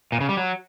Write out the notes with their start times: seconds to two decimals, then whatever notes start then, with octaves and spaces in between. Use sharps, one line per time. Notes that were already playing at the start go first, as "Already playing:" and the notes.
0.12 A#2
0.21 C#3
0.29 G3
0.37 F#3